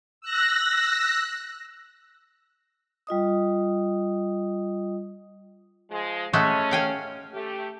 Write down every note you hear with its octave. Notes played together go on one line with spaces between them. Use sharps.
E6 F#6 A#6
G3 F4 D#5 D#6
F3 G#3
G#3 A3 C#4 F#4
F5 G5 G#5
A3 G4